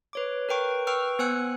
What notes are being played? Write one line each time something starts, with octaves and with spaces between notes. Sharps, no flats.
B4 C#5 D6
A#4 B4 G5 C#6
B4 G5 C#6 E6 F6
B3 C5 G#5 E6 F#6 C#7